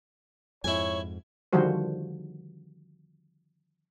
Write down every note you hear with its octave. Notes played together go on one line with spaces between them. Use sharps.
F2 G#2 E4 C#5 G#5
D3 D#3 F3 G3 F#4 C5